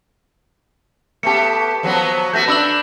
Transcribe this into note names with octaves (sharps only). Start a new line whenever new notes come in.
A3 B3 G4 A5 C#7
F3 F#3 B3
A3 B3 F#4 G6 A#6
D4 B5 E6 F#7